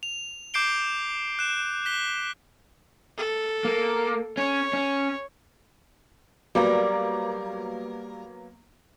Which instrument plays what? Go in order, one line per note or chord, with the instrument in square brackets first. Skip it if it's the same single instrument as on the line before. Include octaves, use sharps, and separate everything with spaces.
[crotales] F7
D6 G6 C7 D7 G7
F#6 E7
F#6 B6 G7
[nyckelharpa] A4
[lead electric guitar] A#3
[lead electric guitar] C#4 [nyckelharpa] C#5
[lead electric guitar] C#4
[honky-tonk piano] F#3 A#3 B3 [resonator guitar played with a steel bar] G3 A#4